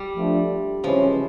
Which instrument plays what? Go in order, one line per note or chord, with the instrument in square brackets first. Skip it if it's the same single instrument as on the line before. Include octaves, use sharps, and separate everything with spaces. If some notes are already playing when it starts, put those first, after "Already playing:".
Already playing: [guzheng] G3
[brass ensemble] F3 A3 D4
[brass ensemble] C#3 E3 G#3 C#4 [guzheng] F3